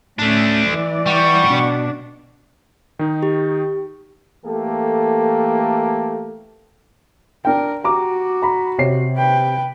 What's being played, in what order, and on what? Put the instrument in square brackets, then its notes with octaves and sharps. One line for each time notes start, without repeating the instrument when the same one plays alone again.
[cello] A2 C#4 [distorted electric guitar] A3 D4
[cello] E3 D5
[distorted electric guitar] G3 [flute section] F#5 C#6
[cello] B2 D4
[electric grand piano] D#3 D#4
[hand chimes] G4
[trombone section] E3 A3 A#3 G4 A4
[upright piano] D4 G5 [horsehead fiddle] A#4
[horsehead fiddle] F#4 [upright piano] G4 A#5 D6
[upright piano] A#5 B5
C3 C#5 C7
[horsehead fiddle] B4 G5